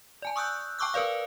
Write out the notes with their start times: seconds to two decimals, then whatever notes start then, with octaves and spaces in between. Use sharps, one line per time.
0.22 D5 G#5 A5
0.36 C#6 D#6 E6 F#6 G6
0.79 G5 A5 C#6 D6 E6 F#6
0.94 A#4 B4 D5 F5